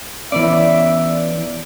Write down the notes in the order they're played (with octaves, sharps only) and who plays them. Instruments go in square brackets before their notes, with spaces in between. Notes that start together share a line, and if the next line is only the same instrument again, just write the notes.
[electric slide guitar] E3 B3 C#4 [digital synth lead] D5 [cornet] E5